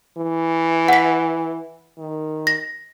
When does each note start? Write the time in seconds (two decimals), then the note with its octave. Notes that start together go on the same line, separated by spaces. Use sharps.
0.17 E3
0.88 F#5 B6
1.98 D#3
2.47 A#6